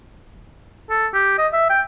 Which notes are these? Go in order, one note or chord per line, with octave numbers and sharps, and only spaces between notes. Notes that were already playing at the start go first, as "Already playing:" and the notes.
A4
G4
D#5
E5
G5